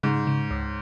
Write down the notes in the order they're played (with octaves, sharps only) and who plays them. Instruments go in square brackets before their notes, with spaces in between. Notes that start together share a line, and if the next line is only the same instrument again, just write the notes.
[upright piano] G#2 [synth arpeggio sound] C#3
[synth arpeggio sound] C#3
C#2